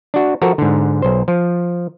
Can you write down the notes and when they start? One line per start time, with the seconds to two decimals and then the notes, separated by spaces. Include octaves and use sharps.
0.14 D4 F#4
0.42 F3 F#4 A4 A#4
0.58 G#2 D3
1.02 B1 C5
1.28 F3